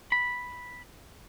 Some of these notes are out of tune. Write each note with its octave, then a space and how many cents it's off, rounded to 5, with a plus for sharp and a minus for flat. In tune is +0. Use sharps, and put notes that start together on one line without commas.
B5 -5